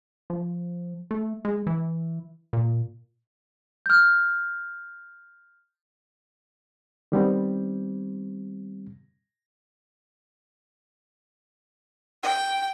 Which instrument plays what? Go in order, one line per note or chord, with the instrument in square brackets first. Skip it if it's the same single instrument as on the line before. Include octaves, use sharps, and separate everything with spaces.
[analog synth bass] F3
A3
G#3
E3
A#2
[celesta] F6 G6
[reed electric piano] D#3 G3 B3 C4
[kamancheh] G5